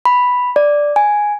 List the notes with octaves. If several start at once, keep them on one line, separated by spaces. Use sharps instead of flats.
B5
D5
G#5